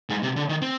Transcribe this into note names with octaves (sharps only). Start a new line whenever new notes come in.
G#2
C3
D3
D#3
C4